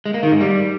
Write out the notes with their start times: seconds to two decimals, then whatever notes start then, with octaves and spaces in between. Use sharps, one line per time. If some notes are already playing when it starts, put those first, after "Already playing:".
0.06 G#3
0.14 A#3
0.23 D#3
0.32 G#2
0.40 G3